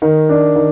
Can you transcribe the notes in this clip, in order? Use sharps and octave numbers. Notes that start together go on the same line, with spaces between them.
D#3
D4
D#3